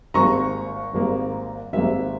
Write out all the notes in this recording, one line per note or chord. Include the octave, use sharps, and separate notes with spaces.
G#1 G#2 G3 A#3 A#5 C#6
G#1 G#2 G3 A#3
G#1 G#2 G3 A#3 E5